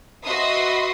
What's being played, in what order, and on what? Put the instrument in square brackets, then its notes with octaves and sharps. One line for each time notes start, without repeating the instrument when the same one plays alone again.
[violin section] F#4 B4 D#5 E5 C6 D#6